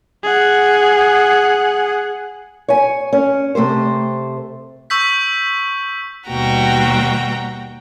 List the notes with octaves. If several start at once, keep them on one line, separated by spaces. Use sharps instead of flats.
G#4 F#5
C#5 G#5
C#4
C3 A3 G4 C5
C#6 E6 G6 B6
D#2 B2 G3 F#4 G5 A#5